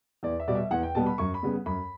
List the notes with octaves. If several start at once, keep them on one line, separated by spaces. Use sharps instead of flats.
E2 D5
E5
B2 G3 B3 D5
E5
E2 F#5
G5
B2 G3 B3 A5
B5
F#2 C#6
B5
C#3 G3 B3
F#2 B5